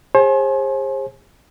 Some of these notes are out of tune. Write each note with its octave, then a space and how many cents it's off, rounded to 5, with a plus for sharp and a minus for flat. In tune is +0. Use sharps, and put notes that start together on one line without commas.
G#4 -45 C5 +40 G#5 +35